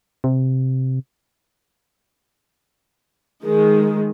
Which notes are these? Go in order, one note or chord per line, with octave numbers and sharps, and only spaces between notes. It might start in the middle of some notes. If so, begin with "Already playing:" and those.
C3
D#3 G#3